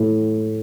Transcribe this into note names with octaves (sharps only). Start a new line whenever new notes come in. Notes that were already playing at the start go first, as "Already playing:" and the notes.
Already playing: A2